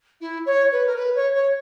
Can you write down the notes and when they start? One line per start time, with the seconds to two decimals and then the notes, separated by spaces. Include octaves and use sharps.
0.20 E4
0.46 C#5
0.71 B4
0.86 A#4
0.96 B4
1.15 C#5
1.34 C#5